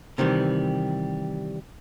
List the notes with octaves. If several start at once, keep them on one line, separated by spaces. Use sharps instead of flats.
C3 D#3 E3 G3